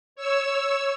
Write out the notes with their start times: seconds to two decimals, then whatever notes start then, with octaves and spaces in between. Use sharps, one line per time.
0.16 C#5 E6